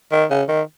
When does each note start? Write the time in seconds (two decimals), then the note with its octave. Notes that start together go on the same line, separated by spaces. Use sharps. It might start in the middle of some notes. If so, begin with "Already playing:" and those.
0.12 D#3
0.30 C#3
0.49 D#3